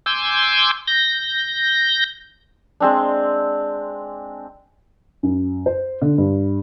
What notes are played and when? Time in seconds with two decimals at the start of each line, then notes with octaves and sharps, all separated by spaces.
0.06 G#5 C6 D6 E6 G6
0.88 G6 A#6
2.80 G#3 C4 D4
5.23 F#2
5.66 C5
6.02 D3
6.18 G2